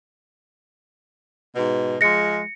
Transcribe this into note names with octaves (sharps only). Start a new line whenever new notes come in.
G#2 B2
F3 G#3 A#6 C#7